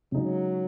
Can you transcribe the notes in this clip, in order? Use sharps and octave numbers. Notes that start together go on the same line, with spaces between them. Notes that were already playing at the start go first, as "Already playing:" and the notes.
C#3 F#3 G#3 D#4